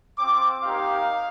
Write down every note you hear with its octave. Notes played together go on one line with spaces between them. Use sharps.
C4 F4 D6
A#3 D#4 G4 F5